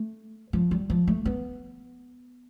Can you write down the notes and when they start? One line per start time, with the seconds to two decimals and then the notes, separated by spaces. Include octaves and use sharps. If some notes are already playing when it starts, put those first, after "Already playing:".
Already playing: A3
0.53 F3
0.71 G3
0.90 F3
1.07 A3
1.26 B3